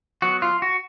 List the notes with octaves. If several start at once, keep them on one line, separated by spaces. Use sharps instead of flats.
F#3 B3 F#4
F4
F#4